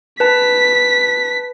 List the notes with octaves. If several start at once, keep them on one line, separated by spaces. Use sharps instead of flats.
B4 A5 B6